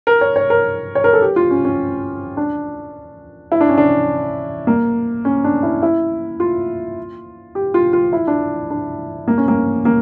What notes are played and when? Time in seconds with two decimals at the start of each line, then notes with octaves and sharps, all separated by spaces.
0.07 A#4
0.21 C#5
0.36 C#5
0.50 A#4
0.95 C#5
1.04 A#4
1.13 A4
1.22 G4
1.36 F4
1.51 C#4
1.65 C#4
2.37 D4
3.52 E4
3.61 D4
3.69 C#4
3.78 D4
4.67 A#3
5.25 C#4
5.44 D4
5.63 E4
5.83 E4
6.40 F4
7.55 G4
7.74 F4
7.93 F4
8.13 E4
8.27 D4
8.70 D4
9.28 A#3
9.38 C#4
9.48 A#3
9.85 A#3